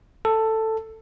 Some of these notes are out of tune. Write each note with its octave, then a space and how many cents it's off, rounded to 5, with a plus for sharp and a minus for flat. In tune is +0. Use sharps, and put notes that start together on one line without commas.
A4 +10